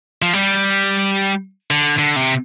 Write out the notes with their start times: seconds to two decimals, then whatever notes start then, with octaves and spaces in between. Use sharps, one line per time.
0.22 F3
0.33 G3
1.71 D3
1.98 D3
2.16 C3